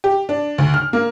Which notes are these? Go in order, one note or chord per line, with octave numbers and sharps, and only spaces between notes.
G4
D4
D2
F6
A#3